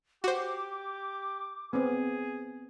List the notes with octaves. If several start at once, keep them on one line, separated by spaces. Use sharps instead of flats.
F#4 G4 C5 D6
B3 C4 G#4